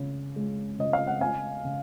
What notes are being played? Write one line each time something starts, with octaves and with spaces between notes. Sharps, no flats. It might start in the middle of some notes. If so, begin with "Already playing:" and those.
Already playing: C#3 C#4
G#3
C#3 D#5
F5
F#5
C#4 F5 G#5
C#3